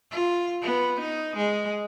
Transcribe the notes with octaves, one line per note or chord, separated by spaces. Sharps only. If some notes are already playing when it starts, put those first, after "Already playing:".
F4
B3
D#4
G#3